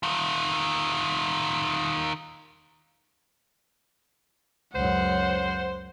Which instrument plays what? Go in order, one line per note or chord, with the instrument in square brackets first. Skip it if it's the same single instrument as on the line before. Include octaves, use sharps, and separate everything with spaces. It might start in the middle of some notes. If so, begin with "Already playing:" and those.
[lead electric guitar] D#3 F4
[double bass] C#2 F#2 [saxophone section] C5 [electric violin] F#5